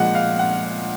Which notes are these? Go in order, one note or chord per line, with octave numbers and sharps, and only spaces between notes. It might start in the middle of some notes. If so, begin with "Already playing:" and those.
Already playing: A#2 F3 G#3 F#5
F5
F#5